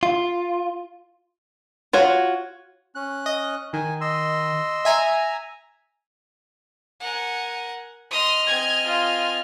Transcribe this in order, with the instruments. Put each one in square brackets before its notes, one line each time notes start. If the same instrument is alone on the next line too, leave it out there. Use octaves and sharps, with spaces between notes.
[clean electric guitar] F4
[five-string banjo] F4 F#4 C#5
[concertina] C#4 F#6
[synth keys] D#5
[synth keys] D#3 [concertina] G#5
[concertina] D#5 C6 E6
[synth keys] E5 G#5 A#5
[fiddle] A#4 G#5 [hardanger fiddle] F#5
[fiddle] D#5 F6 [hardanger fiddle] C6 D#6
[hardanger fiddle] C4 G#5 [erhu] G#6
[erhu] F4